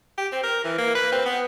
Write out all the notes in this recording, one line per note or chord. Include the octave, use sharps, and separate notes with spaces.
G4
C4
A#4
E3
A#3
B4
C4
B3